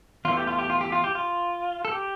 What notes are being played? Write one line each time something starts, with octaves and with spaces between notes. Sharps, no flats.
E2 E3 A3 F4
G4
F4
G4
F4
G4
F4
G4
F4
A4
G4